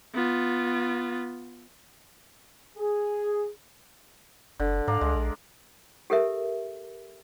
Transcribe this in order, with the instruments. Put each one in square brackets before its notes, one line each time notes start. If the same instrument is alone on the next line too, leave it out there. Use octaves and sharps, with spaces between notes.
[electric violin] B3 F4
[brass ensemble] G#4
[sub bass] F#1 [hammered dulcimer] D3
[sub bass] G#2 [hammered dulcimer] D5 F5 A#5
[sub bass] C#2 [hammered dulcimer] G#3
[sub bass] A#1
[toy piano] G4 A4 A#4 E5